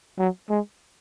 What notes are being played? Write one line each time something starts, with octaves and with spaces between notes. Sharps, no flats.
F#3
G#3